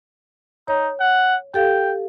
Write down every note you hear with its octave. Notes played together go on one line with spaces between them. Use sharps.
D#4 C#5
F#5
G4 A4 F5 G5